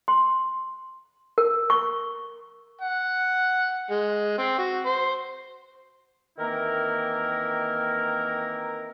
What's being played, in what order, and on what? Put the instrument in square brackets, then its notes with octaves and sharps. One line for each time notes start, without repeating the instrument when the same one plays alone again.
[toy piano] C6
A#4
C#6
[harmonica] F#5
G#3
C4
F#4
C5
[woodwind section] D#3 E3 A#3 C4 E4 A#4